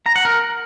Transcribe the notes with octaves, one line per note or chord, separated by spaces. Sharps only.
A#5
F#5
A#4